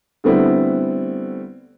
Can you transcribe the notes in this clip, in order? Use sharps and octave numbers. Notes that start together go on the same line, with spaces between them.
D3 G3 A3 B3 C4 E4